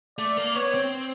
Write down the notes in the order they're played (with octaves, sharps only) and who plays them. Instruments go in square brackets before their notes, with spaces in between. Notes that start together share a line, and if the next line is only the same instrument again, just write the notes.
[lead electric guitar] A3 [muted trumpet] D5
[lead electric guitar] A#3
[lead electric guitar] B3 [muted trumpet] C#5
[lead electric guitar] C4